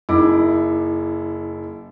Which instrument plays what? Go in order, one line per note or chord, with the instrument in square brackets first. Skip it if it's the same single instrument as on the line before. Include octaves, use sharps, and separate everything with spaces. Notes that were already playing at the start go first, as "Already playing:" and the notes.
[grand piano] F#1 D#4 E4 D6